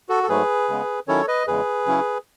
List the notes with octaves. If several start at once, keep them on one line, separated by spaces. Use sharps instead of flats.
F#4 A4
A4
G#2 F#3 A3 G#4 B4
C#3 G#3 B3
D#3 F#3 C#4 E4 A4 C#5
B4 D#5
E2 C#3 G#3 G#4 B4
C#3 F#3 C#4 E4